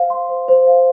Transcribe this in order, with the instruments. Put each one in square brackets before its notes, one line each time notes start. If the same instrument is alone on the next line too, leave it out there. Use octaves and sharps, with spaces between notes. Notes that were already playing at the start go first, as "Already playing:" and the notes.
Already playing: [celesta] C5 F5
C6
C5
C5
F5